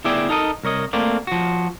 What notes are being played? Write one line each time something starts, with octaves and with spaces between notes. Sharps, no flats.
D2 B3 E4 G#4 D5 G5
D#4 A4 A#4 D#5
C2 A#4 C#5 D#5
A3 A#3 C4 D5
F3 F#4